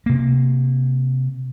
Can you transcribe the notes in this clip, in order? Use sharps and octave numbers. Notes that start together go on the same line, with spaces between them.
C3 A#3